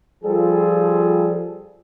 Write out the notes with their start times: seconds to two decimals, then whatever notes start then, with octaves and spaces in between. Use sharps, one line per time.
0.24 F3 G3 F4 G#4 A4